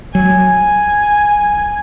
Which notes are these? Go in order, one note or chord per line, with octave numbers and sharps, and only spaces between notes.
F#3 G#5